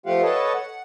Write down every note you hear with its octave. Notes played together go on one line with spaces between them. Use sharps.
F3 A3 F4 G4 F5 F#5
A4 B4 C#5 D#5 F#5 A5
F#5